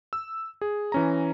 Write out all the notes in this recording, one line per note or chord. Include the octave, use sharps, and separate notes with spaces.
E6
G#4
E3 C#4 A#5